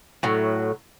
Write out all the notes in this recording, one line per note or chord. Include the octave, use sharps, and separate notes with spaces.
A2 F#3